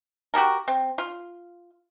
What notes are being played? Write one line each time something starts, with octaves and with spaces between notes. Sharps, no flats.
F#4 G4 A4 A#4
C4
F4